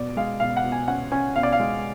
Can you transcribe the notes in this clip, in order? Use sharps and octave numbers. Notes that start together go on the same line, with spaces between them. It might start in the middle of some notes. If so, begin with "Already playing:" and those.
Already playing: B2 D5
G#3 F5
B2 F5
F#5
B2
G#5
C#4 F#5
C#4 G#5
B2 F5
D5
F5
G#3